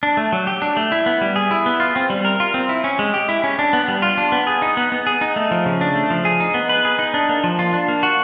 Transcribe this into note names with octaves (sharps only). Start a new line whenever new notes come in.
D4
A3
F#3
G4
D4
A3
E4
B3
G3
G#4
E4
B3
F4
C4
G3
A#4
F4
C4
E4
C#4
G#3
G4
E4
C#4
D4
B3
G3
F4
D4
B3
G#4
D#4
B3
B3
G#4
D#4
A3
F3
C#3
D4
A3
F3
G#4
D#4
B3
B4
G#4
D#4
D4
A#3
F3
F4
D4
A#3
F#4